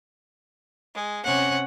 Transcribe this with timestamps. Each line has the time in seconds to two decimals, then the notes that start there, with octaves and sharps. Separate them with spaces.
0.94 G#3
1.24 C3 C#4 F#5